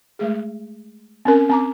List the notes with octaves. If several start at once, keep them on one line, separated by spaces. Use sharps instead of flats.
G#3 A3 G#4
C4 C#4 A#4
C4 A#5 D6